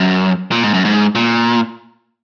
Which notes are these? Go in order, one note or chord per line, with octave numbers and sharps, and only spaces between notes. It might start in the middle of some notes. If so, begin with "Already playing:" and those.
Already playing: F#2
A#2
G#2
F#2
G#2
A#2